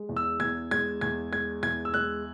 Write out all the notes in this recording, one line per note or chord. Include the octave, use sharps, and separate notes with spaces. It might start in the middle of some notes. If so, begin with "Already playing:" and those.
Already playing: G#3
E2
E6
E2 G#6
G#3 G#6
E2 G#6
G#3 G#6
E2 G#6
E6
G#3 F#6